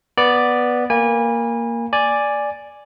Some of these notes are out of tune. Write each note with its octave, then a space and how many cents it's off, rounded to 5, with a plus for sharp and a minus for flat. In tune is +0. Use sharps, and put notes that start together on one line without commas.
B3 -5 D5 +0
A#3 +0 G#5 -25 B5 -25
D5 +0 G#5 +0